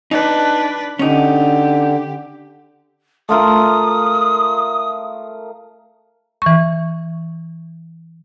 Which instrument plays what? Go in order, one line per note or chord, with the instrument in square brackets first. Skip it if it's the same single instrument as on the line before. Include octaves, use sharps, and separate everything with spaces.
[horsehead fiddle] D4 B4 [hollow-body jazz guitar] D#4
[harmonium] D3 [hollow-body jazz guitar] C#4 D#4 [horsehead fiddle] G4
[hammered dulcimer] A3 F4 A#4 [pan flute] D#6
[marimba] E3 C#6